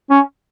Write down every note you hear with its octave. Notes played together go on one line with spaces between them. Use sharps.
C#4